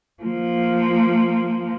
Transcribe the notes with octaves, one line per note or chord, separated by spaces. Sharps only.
F3 A#3